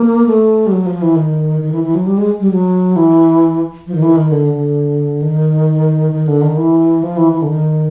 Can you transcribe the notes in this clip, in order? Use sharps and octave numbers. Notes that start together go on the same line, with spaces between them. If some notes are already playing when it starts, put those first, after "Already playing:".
Already playing: A#3
A3
G3
F#3
F3
E3
D#3
D#3
E3
E3
F#3
G3
G#3
G3
F#3
E3
F3
D#3
E3
D#3
D3
D3
D#3
D#3
D3
D#3
E3
F3
E3
E3
D3
D#3